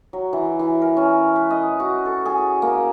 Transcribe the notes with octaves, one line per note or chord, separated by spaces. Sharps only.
F#3
E3
E3
A#4
C#4
B4
D#5
F#4
A4
G#4
A#3